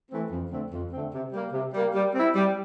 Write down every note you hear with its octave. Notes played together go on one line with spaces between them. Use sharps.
E3 A3 C4
F2
D3 A3 C4
F2
D3 A3 C4
C3
G3 A#3
C3
G3 A#3
G3
C4 E4
G3